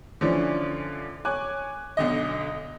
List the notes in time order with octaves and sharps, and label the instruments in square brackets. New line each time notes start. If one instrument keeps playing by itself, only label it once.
[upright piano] D3 E3 F3 C#4 D4
C#5 G#5 D6 F#6
B1 D3 D#5